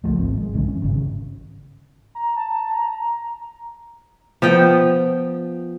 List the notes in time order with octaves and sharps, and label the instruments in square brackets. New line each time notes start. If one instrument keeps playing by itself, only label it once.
[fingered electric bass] C#2 F3 A3
G#1 C4
G#3
B1 G2 D3 E3
C#4
G#1 C#3
[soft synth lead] A#5
A5
A#5
[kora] F3 B3 G5